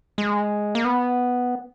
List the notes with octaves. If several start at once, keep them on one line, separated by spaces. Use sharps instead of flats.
G#3
A#3
B3